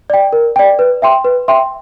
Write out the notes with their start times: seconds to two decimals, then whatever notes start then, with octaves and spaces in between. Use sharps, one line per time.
0.10 D5 G5
0.33 A#4
0.56 D5 G5
0.79 B4
1.02 E5 G5 C6
1.25 B4
1.48 E5 G5 C6